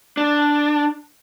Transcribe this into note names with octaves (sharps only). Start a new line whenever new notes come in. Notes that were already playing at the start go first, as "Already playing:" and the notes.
D4